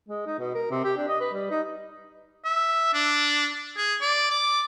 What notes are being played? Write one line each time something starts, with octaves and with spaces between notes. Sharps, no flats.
G#3
D#4
B2
A#4
C3
G4
D4
D#5
B4
G3
D#4
E5
D4
G#4
D5
D6